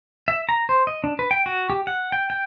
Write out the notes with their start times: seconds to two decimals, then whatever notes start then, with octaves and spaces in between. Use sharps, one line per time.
0.28 E5
0.49 A#5
0.69 C5
0.87 D#5
1.04 D4
1.19 B4
1.31 G5
1.46 F#4
1.70 G4
1.87 F#5
2.12 G5
2.30 G5